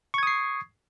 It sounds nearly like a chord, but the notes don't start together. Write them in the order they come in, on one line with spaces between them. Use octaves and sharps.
C#6 G#6 D#6 C7